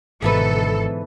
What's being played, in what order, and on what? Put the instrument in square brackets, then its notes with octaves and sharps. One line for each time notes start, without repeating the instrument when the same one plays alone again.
[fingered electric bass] G#1 [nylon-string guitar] G#2 E3 B4 [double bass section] B2 D3 [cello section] A4